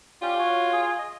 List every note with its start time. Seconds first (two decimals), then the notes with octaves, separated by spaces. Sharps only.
0.22 C#4 F4 G4 D5
0.39 F#4 C#5
0.72 G#4
0.99 D#5